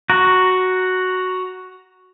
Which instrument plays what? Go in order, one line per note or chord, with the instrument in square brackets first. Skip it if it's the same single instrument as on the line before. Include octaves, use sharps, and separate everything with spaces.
[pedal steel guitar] F#4 A#5